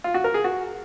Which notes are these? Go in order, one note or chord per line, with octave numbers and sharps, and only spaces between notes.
F4
F#4
A#4
G#4
F#4